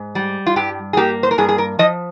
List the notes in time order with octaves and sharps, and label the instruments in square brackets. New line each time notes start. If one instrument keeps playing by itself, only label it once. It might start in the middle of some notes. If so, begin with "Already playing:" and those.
Already playing: [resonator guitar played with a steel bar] G#2
G3
F4
G2 G4
G#4
A#3 G4
C5
A#4
G2 G#4
G#4
A#4
F3 D#5